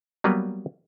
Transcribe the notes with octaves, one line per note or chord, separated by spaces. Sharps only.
F#3 G3 A#3 B3 B4